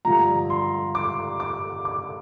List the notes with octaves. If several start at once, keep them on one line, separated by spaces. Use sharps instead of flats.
G2 D3 F3 A#5
C6
D6
D6
D6